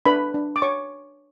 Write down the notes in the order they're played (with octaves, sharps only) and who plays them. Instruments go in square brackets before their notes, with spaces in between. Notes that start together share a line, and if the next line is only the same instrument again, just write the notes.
[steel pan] D4 B4 B5
D4
D6
C#5 C#6